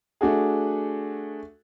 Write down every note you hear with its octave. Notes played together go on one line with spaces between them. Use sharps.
A3 D4 F#4 G#4